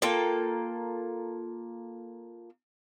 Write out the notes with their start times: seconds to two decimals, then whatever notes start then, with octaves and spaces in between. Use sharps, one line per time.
0.02 A#3 F4 A4 G5